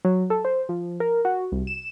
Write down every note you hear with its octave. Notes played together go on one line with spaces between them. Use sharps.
F#3
A4
C5
F3
A#4
F#4
C2
E7